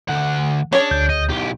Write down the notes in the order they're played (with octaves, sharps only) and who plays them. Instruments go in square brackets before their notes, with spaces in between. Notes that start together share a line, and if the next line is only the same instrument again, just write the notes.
[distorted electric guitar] D2 F#5
[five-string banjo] C#4 G#4 C#5 [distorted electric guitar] D4
[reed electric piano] D2 G6
[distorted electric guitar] D#5
B1 G4